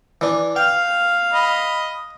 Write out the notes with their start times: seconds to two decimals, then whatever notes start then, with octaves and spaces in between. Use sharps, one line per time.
0.21 E3 D4
0.56 F5 G5
1.34 D#5 B5